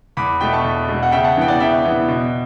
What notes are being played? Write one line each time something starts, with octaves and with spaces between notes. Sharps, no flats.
E2 B5 D6
B2 A3 G5 B5
A5 C#6
E2
B2 A3
F#5
C#3 E5 G5
F#5 A5
E3 B3 G5
D5 F#5
C#3 E5 G5
E3 B3
B2